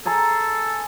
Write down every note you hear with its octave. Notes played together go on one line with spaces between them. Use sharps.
G#4 A4 A#5 C6